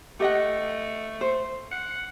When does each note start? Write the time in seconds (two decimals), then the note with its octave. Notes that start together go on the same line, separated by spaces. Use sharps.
0.20 A3 G4 D#5 F#5
1.21 C5
1.72 F#5